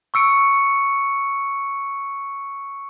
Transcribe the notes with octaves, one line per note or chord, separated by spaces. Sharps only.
C#6 E6 C#7 D7